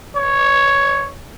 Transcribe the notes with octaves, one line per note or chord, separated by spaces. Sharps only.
C#5